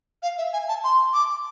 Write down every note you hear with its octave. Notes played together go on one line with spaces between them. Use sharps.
F5
E5
G#5
A5
C6
D6